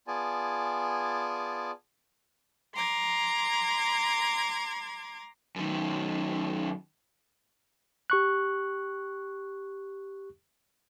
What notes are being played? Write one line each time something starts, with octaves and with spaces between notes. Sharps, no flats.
B3 F4 G#4 D5 G#5 A5
A#5 C6 D6 G#6
F#2 D#3
G4 C#6 F#6